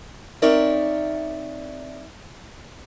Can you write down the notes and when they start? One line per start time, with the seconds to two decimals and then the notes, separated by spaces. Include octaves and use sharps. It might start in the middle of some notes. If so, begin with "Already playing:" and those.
0.42 C4 D#4 A#4 C#5 D5 E5